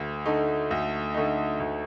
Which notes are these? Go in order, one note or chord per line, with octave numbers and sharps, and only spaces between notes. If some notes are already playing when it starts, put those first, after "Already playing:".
Already playing: D2
D3 A3 D#4
D2
D3 A3 D#4
D2